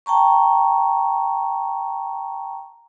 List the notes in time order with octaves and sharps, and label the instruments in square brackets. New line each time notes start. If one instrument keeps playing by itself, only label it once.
[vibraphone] G5 A5 A#5 C#6